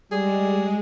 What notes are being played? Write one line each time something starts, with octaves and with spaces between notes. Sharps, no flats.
G3 G#3 G#4